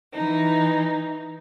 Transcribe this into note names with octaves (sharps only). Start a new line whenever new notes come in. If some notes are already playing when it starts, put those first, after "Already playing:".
E3 D#4